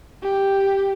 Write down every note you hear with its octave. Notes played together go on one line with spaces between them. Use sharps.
G4